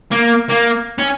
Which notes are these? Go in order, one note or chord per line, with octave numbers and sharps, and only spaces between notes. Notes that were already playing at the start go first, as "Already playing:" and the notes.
A#3
A#3
C#4